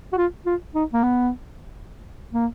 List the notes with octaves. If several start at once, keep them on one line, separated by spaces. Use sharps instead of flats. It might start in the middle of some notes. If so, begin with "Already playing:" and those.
F#4
F4
F4
D#4
A#3
B3
A#3